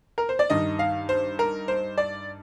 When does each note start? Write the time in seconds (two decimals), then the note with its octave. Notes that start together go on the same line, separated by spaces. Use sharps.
0.18 A#4
0.29 C5
0.39 D5
0.50 G2 D#3 D#5
0.79 F5
1.09 C5
1.39 A#4
1.68 C5
1.98 D5